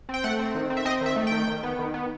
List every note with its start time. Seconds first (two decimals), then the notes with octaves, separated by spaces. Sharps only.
0.09 C4 G5
0.24 A3 F#5
0.39 C4
0.55 D#3
0.70 C4
0.77 E5
0.85 C4 D#5
1.01 D#3 E5
1.16 A3
1.27 D#3 G5
1.47 D#3
1.63 B3
1.79 D#3
1.94 B3